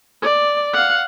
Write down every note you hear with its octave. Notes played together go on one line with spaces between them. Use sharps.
D5
F5 F#5